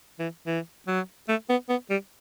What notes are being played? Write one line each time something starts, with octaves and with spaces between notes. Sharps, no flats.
E3
E3
F#3
A3
B3
B3
G3